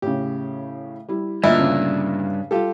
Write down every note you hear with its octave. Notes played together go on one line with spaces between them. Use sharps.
A2 C#3 G4
G3 E4
D2 G2 A#2 E4 D#5 E5
C#3
G3 F4 G4 A4